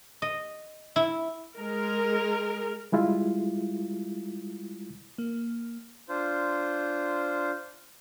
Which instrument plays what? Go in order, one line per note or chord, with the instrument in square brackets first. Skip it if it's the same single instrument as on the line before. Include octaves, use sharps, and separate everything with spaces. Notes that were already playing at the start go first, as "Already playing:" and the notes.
[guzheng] D#5
E4
[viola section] G#3 A#4
[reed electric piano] G3 G#3 E4 F4
[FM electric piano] A#3
[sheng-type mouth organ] D4 F4 C5